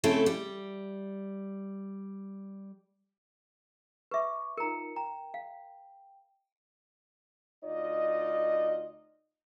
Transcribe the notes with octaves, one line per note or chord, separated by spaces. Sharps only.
C#3 A3 C4 E4 A4
G3
B4 E5 C#6 D6
D#4 F4 A#4 A#5 C#7
G5 A#5
F5
D2 D#4 F4 D5 D#5